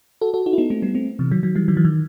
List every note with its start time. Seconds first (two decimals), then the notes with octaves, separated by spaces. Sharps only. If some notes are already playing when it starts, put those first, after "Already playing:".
0.21 F#4 A4
0.34 F#4 A4
0.46 D#4 F#4
0.53 E4
0.58 B3 D#4
0.70 A3 C4
0.82 G3 B3
0.95 A3 C4
1.19 C3 E3
1.31 D#3 F#3
1.43 D#3 F#3
1.55 E3 G3
1.68 D#3 F#3
1.77 E3
1.85 D#3